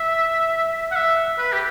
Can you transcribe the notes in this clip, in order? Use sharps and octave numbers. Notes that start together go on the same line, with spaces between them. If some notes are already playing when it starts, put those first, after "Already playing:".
Already playing: E5
F#5
E5
B4
G4